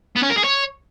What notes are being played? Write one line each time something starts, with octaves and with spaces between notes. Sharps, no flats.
B3
C#4
A#4
G#4
C#5